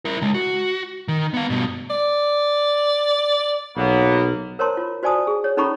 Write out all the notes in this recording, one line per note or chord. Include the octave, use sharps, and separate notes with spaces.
E4 A#4
C#3 G#3
F#4
D#3
B3 F5
G2 B2
D5
B1 F#3 A#3 B3
A#4 C5 C#5 A5 A#5 C6
F4
F#4 C5 D5 G#5 A5 D#6
G#4
C#5
C#4 D#4 A4 A#5 B5 C#6